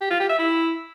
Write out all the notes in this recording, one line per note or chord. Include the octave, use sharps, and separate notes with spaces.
G4
F4
G4
E5
E4